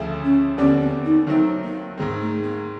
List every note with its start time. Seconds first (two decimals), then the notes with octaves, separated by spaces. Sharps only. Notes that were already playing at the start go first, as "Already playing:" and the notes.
Already playing: D2 C#3 F3 A3
0.23 C#4
0.57 D#2 D3 G3 B3 C#4 D4
0.80 C4
1.04 D#4
1.27 D#3 F#3 A3 C4 D#4
1.63 A#3
1.97 G#2 D#3 G#3 A#3 C4
2.20 A3
2.43 A#3